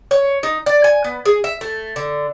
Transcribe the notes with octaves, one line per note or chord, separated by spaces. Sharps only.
C#5
D#4
D5
G#5
B3
G#4
E5
A3
D3